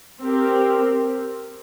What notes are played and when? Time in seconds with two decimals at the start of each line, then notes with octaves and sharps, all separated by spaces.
0.21 C4 G4 A#4